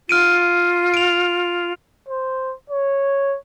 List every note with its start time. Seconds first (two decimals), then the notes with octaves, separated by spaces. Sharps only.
0.09 F4 F6 D7 D#7
0.94 D7 F7
2.08 C5
2.70 C#5